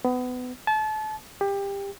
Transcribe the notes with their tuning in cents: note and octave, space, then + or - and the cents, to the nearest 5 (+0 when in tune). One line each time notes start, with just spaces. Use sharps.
B3 +25
A5 -30
G4 +20